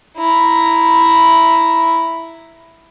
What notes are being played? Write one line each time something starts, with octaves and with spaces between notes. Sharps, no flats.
E4 A#5